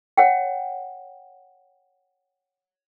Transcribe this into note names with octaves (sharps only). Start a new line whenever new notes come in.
C#5 F#5 G5